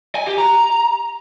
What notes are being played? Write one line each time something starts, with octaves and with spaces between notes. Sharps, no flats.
G#5
G4
A#5